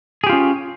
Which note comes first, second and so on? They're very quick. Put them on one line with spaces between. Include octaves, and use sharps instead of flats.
G#4 G4 F4 C#4